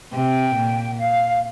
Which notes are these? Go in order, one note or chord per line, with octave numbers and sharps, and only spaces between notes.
C3 G5
A#2
F5